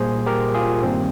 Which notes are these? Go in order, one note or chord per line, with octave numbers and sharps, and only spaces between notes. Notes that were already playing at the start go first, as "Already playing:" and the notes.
Already playing: A#2 G3 A#3 G#4 C5
G4 A#4
F4 G#4
G2 D#3 G3 A#3 C4